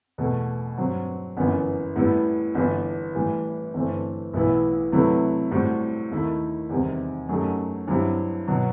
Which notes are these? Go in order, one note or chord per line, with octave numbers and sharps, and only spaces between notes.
E2 B2 A3
G2 F#3 C4 F#4
G1 F#2 E3 B3
A2 G3 B3 E4
G1 G2 E3 B3
A2 E3 G3
G1 G2 E3 A3 C4
B1 A2 E3 B3 E4
C3 F#3 A3 E4 B4
A2 G3 C4 F#4
D#2 D#3 A3 E4
E2 C3 D#3 G3 C4
F#2 F#3 A3 D#4 G4
G2 F#3 C4 E4 G4
B2 F#3